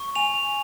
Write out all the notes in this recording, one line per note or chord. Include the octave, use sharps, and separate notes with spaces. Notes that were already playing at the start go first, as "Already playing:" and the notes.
Already playing: C#6
G#5 F7